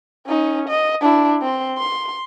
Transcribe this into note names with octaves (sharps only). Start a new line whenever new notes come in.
C#4 D#4
D#5
D4 E4
C4 C6
C6